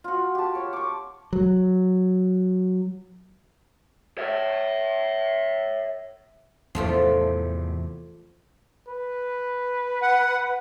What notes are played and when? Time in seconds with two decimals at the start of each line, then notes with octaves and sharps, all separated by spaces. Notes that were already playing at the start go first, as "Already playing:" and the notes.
0.04 F4 F#4
0.35 G4 A5
0.55 C#5
0.73 C#6 D6
1.33 F#3
4.18 C#5 E5
6.75 E2 A2 C3 F3 A3 F4
8.88 B4
10.02 F#5